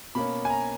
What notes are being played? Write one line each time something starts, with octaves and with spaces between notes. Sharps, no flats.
B2 A#3 C#4 B5
G#5
A#5